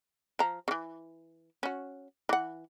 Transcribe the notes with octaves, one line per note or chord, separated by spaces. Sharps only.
F3 A#5
C#3 E3
C#4 F#4
E3 F#5